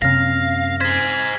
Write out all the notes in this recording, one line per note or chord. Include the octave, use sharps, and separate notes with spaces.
F#2 C3 A#3 C#4 F5 F6 A#6
G#4 C5 G#6 B6